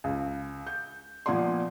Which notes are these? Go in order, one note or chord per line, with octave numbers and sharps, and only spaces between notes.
C#2
G6
A#2 F3 B3 D5 C6